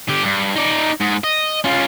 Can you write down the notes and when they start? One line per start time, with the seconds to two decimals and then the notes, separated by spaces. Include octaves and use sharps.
0.09 D3 G4
0.23 G2
0.56 D#4 D5
1.00 G#2
1.24 D#5
1.64 C#4 F4